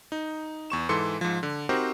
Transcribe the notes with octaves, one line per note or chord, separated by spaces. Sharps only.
D#4
E2 C#6 E7
G#2 E3 A4 C6 C#7
G#2 F3
D3
C4 D#4 F#4 G4 A#4 C5